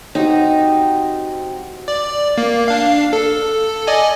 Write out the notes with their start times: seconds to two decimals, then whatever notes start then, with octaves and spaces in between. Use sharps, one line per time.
0.15 C4 D#4 F#4 G4
1.88 D5
2.38 A#3
2.68 D4 F5
3.13 A4
3.87 D5 D#5 G#5